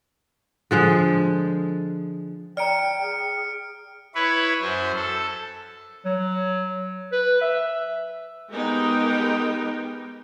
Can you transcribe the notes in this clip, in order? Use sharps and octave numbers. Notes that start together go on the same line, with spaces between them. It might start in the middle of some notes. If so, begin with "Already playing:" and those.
D3 F3 G#3
D5 G5 A#5 F6 C#7 D7
G#4
E4 B4 C#5
F#2 C5
A4
F#3
B4
E5
G#3 B3 D#4 G4 A#4 G5